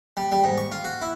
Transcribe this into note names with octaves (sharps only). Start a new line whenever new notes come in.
G3
G3
G#2
C#6
F4
F#4
E4